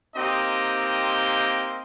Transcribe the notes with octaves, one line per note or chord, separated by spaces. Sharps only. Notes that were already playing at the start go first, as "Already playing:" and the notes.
A#3 C4 D#4 G4 D#5